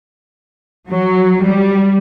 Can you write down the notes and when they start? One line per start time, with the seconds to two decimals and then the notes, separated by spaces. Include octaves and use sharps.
0.89 F#3
1.44 G3